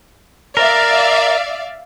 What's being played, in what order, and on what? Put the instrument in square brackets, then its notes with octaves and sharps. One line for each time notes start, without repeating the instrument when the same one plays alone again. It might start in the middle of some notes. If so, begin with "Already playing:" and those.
[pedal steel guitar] A#4 [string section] D5 E5 F5